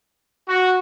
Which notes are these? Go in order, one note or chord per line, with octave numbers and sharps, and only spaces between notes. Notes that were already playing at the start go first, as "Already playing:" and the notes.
F#4